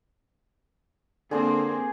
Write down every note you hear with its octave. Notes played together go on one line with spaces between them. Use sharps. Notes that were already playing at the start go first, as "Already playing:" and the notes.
D3 A#3 C4 G#4 C5 D#6